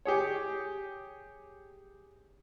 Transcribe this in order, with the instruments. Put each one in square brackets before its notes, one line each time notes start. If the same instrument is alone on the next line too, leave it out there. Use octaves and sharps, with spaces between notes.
[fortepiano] G4 G#4 C#5